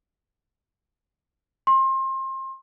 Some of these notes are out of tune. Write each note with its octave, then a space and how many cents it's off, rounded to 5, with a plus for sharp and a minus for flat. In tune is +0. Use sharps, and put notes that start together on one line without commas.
C6 +30